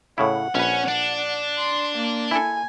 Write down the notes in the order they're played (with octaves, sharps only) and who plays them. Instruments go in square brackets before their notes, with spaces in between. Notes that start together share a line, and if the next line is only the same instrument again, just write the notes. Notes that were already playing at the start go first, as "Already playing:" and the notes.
[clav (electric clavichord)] A2 C#3 E4 [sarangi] F#5
[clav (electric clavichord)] A#1 B4 [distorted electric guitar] C#4
[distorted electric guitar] D4
[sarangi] C6
A#3
[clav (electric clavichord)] E4 A4 [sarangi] G#5